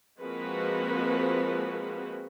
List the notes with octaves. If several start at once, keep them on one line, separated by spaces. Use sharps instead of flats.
F3 G#3 A#3 C4 F#4 B4